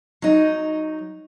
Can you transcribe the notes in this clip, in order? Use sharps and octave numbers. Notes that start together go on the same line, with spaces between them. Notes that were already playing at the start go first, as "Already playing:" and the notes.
F#3 D#4